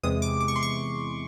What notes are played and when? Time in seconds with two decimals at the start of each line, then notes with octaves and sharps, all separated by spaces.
0.03 E2 C3 E3 G#3 D#6
0.22 D6
0.41 D6
0.48 C#6
0.56 C6
0.63 C#6